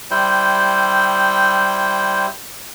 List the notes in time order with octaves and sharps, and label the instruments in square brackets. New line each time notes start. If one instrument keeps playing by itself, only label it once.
[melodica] G3 E4 C5 G5